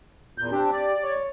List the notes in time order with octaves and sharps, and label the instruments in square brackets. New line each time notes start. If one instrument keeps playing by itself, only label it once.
[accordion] E2 A#2 G6
[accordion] C4 D4 [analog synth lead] G4
[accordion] D5
[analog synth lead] C#5